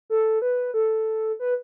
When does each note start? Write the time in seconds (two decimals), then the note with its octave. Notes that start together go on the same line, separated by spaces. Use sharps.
0.10 A4
0.42 B4
0.74 A4
1.39 B4